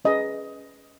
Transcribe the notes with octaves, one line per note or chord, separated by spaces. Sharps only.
C#4 G#4 B4 D#5